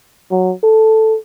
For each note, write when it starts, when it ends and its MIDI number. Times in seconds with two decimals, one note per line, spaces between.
0.31 0.52 54
0.64 1.17 69